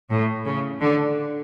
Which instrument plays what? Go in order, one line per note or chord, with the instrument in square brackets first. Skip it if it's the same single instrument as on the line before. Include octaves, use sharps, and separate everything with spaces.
[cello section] A2
C#3
D3